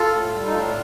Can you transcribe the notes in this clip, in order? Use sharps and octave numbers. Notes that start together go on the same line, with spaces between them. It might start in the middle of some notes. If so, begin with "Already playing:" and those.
Already playing: F4 A4
A2
G3
D#4
A2 D4 F4